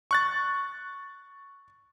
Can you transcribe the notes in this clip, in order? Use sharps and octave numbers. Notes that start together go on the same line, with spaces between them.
C#6 F#6 A6